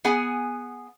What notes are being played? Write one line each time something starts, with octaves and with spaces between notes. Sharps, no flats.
B3 G#4 F#5 G#5